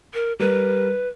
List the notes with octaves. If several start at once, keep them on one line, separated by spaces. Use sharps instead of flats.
A#4
G3 A#4 B4